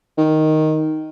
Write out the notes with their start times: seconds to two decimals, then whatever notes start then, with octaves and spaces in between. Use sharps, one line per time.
0.18 D#3